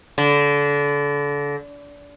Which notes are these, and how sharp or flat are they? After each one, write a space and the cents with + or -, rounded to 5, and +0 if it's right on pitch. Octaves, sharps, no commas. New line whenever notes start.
D3 -30